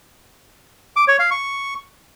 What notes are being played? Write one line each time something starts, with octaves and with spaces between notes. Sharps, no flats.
D6
C#5
F5
C#6